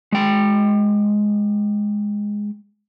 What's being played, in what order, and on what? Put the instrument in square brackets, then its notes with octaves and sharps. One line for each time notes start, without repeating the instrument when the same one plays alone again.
[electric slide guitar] G#3 G5